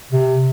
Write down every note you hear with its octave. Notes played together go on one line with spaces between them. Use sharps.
C3